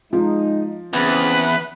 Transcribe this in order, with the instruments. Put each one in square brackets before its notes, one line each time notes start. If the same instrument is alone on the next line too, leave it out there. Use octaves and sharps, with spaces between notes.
[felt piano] F3 [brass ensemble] G#3 D#4
[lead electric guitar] E2 [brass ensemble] C#3 B3 C4 [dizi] B4